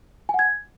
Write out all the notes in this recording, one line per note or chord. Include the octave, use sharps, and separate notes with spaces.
G#5
F#5
G#6